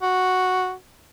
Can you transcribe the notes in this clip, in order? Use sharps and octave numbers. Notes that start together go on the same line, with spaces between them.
F#4